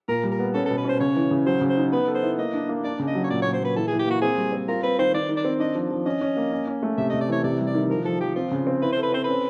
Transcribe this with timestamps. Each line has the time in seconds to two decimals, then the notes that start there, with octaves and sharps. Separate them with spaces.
0.08 A#2 A#4
0.24 G3
0.31 A#4
0.39 B3
0.54 C#4 A4
0.66 A4
0.70 B2
0.77 B4
0.85 C#4 C5
1.00 C#3 C#5
1.16 E3
1.31 C#3
1.46 F#3 C5
1.61 C#3
1.69 C5
1.77 D#4
1.92 B3 B4
2.08 A4
2.15 C5
2.23 E4
2.38 A#3 D#5
2.54 D4
2.69 A#3
2.84 D4 D5
3.00 C#3
3.07 D#5
3.15 F#3
3.24 C#5
3.30 A#2 D5
3.42 A#2 C#5
3.54 C5
3.61 A#2 B4
3.76 E3 A4
3.87 G#4
3.91 E3
3.99 G4
4.07 A#3 F#4
4.22 C4 G#4
4.37 G3
4.53 C4
4.68 F4 A#4
4.83 C4 B4
4.99 D#3 C5
5.14 D#3 D5
5.29 D#3
5.37 D5
5.45 C4
5.60 D4 D#5
5.75 F3
5.91 F3
6.06 C#4 D#5
6.21 C#4
6.37 A#3
6.52 C#4
6.67 C#4
6.83 A3
6.98 C3 E5
7.09 D#5
7.13 C3
7.21 D5
7.29 E3 C#5
7.44 C3 D5
7.59 G3
7.67 D5
7.75 D#3
7.90 F3 A#4
8.05 F3 A4
8.20 F3 G4
8.35 C4 F4
8.51 C#3
8.67 C4
8.82 E4 B4
8.92 A4 C5
9.03 B4
9.12 C4 C5
9.24 C#4 B4